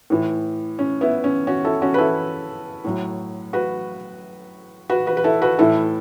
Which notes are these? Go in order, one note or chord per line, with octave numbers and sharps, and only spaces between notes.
A2 E3
C#4
B3 E4
C#4
C#4 F#4
E4 A4
C#4 F#4
B4
E4 A4
A2 F#3
F#4 B4
F#4 B4
F#4 B4
B4
E4 A4
F#4 B4
A2 E3 E4 A4